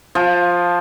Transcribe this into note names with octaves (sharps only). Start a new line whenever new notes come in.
F3